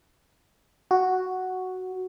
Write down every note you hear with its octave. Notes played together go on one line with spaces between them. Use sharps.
F#4